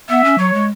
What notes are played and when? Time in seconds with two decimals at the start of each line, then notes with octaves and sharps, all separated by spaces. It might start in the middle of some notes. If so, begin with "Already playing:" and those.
0.09 B3 E5
0.24 C#4
0.38 F#3 C#5
0.54 G#3